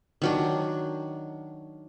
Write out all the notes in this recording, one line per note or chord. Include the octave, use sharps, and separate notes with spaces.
D#3 F#3 D4